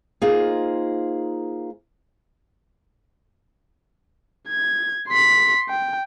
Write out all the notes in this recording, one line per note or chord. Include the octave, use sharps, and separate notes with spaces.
A#3 D#4 F4 G#4 C5
G#6
C6 B6
G5